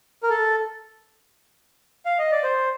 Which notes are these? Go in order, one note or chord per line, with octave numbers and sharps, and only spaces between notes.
A#4
A4
F5
D#5
D5
C5